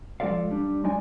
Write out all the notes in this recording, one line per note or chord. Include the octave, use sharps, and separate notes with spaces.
F3 G#3 F4 A4 D5 F5
G3 D4
F#3 G#3 D#4 D5 G#5